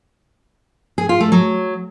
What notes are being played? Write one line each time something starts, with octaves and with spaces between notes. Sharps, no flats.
G#4
F4
A3
F#3